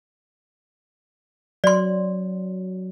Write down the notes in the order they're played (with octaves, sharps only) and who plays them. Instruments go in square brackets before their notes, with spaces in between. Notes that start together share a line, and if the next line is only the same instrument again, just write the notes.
[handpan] F#3 [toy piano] D5 C6